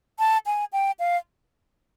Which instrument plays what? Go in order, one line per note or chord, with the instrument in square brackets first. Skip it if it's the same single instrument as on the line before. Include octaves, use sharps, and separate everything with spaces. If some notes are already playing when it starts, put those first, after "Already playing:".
[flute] A5
G#5
G5
F5